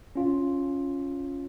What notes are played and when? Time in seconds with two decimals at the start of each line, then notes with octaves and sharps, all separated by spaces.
0.16 C#4 F4